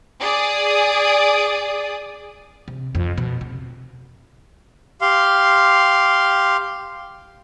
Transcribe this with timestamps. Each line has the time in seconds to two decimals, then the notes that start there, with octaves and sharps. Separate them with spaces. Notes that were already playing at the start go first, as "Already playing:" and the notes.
0.21 G#4 D5 D#6
2.68 C3
2.95 F2
3.18 B2
3.41 C3
5.01 G4 F5 C6